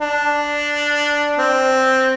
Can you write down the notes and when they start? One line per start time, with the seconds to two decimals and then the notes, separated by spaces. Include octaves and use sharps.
0.01 D4
1.38 C4